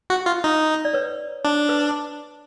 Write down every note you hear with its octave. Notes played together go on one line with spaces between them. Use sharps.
F#4
F4
D#4
D5
B4 C#5
D4
B4